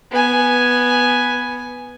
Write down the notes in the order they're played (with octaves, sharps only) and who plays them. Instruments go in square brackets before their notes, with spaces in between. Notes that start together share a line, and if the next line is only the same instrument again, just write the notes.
[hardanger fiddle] B3 G#5